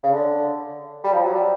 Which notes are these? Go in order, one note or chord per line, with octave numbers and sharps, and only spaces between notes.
C#3
D3
G3
F3
F#3
G3